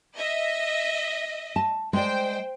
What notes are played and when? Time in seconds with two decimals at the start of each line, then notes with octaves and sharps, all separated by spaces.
0.16 D#5 E5
1.56 A5
1.93 G#3 C5 D5 G5